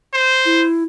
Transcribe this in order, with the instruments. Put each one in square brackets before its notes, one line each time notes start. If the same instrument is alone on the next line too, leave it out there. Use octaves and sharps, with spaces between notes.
[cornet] C5
[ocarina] E4